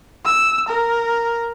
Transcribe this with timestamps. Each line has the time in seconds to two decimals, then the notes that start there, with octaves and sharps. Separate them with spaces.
0.25 E6
0.69 A#4